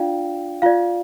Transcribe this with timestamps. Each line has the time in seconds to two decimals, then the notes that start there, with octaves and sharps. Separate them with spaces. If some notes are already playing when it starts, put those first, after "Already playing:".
Already playing: D4 F4 D5 F5 G5
0.62 F4 D5 F5